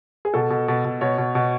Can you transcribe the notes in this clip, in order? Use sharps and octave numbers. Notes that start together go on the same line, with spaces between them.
G#4
B2 A4
B2
B2
B2
B2 C#5
B2
B2